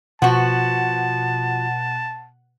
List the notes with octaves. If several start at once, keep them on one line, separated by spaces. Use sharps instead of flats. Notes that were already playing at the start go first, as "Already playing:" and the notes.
B2 F3 F#4 F#5 A5